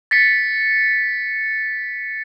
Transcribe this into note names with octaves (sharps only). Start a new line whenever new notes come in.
A6 B6 C#7